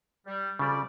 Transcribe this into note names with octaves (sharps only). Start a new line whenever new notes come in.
G3
F2 C#3 G3 F4 D5